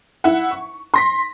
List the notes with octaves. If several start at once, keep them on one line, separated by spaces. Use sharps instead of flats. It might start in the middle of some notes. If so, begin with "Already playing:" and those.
E4 E5 F#5
C#6
C6 A#6 B6